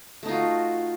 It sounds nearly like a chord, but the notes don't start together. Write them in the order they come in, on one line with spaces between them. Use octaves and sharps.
A3 D#4 F4 F#4